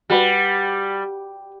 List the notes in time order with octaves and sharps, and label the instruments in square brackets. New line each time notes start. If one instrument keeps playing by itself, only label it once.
[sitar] G3 [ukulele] F#4 B4